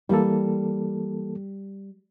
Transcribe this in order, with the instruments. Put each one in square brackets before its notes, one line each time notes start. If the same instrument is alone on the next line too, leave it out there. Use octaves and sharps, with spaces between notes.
[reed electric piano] E3 A#3 A4 [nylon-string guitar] G3